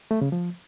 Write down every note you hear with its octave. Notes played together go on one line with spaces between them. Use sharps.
A3
C#3
F3